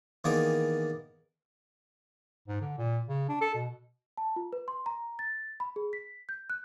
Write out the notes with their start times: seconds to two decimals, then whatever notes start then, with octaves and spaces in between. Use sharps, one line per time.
0.24 D#3 E3 A#3 B3 G#4 D5
2.48 G#2
2.61 D3
2.78 A#2
3.09 C#3
3.29 D4
3.41 A4
3.55 B2
4.17 A5
4.36 F4
4.53 B4
4.68 C6
4.86 A#5
5.19 A6
5.60 B5
5.76 G#4
5.93 B6
6.29 G6
6.50 F#6